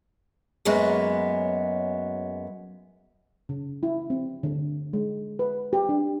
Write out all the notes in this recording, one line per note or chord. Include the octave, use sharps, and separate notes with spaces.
F#2 F#3 G#3 A#3 B3
C#3
E4
C4
D3
G#3
B4
G4
D4